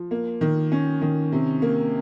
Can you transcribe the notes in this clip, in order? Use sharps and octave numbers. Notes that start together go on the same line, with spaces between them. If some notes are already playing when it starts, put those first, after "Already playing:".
Already playing: F3
A#3
D#3
C#4
D#3
C3
A#3